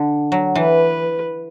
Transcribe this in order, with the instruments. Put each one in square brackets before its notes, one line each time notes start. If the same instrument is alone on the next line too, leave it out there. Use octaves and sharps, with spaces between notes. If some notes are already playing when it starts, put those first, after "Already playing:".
Already playing: [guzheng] D3
F#3
[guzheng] E3 [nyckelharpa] B4